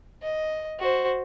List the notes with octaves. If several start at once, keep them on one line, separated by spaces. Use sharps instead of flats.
D#5
F#4 C5